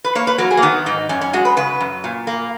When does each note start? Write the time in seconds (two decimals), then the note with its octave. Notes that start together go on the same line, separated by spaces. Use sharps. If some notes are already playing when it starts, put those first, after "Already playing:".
0.04 B4
0.15 A#3 C#5
0.27 B4
0.38 F#3 A#4
0.51 G#4
0.57 A#3
0.62 D#3 B3
0.86 G#2 D#4
1.09 F#2 C#4
1.21 C#4
1.33 G#3 F#4
1.45 B4
1.57 C#3 B4
1.80 F#2
2.04 A#2
2.27 A#3